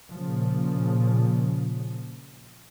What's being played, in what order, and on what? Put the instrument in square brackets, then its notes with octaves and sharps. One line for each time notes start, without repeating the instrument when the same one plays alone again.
[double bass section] A#2 C#3 F3